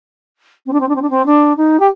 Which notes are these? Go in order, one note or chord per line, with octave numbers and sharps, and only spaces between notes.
C4
D4
C4
D4
C4
D4
C4
D4
D#4
G4